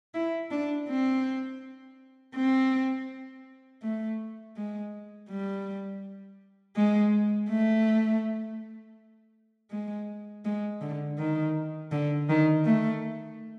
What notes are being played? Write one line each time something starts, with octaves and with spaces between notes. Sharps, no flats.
E4
D4
C4
C4
A3
G#3
G3
G#3
A3
G#3
G#3
D3
D#3
D3
D#3
A3